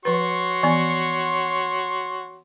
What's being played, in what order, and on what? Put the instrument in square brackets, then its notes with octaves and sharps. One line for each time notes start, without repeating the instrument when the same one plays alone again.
[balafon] F3 B4 [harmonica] F#4 C#5 C6
[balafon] E3 B3 G#5